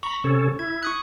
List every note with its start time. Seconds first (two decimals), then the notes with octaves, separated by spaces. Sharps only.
0.03 A#5 B5 C#6
0.24 C3 C#4 A4
0.59 E4 G#6
0.83 C#6 D#6 F#6